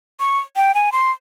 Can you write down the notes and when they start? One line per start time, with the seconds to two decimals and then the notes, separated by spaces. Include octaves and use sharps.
0.20 C#6
0.56 G5
0.75 G#5
0.92 C6